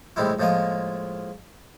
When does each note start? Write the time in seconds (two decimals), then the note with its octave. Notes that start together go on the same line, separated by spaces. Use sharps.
0.16 A1 C3 G3 G#3 E4
0.39 A2 F3 G#3 A#3 G#5